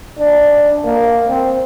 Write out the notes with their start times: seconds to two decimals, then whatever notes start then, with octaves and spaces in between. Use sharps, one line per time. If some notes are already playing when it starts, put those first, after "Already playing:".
0.19 D4
0.85 A#3
1.29 C4